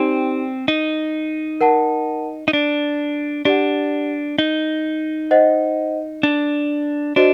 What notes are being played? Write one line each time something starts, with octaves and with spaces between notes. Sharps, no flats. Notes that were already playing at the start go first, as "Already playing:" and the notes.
Already playing: C4 D#4 G4 D5 G5 C6
D#4
A#4 F#5 A5
D#4
D4
D4 G4 D5 F#5
D#4
C5 D#5 F#5
D4
D4 F#4 C5 D#5